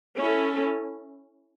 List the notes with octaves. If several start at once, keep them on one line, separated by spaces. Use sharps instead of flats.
C#4 E4 A4